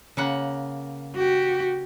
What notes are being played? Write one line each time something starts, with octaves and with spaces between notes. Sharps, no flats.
C#3 A#3 F#5
F#4 G4